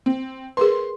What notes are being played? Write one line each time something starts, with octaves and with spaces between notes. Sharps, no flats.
C4
G#4 A#4 B4 C6